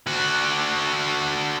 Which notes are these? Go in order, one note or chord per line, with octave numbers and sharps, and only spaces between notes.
D3 F#4